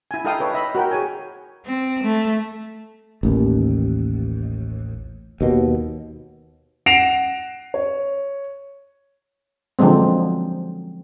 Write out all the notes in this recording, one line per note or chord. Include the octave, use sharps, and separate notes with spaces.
E4 G#5
D#4 E4 A4 F5 G5 D#6
A4 B4 C#5
D#5 E5 B5
F#4 A#4 G5
G#4 C#5 G#5
C4
A3
A1 D#2
D#2 B2
F#5 A#6 C7 D7 E7 F7
C#5
D3 F3 F#3 G#3 C4